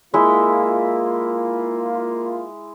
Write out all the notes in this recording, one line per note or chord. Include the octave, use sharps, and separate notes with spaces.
G#3 A#3 E4 F4